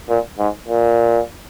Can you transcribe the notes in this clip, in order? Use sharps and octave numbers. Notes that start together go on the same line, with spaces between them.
A#2
G#2
A#2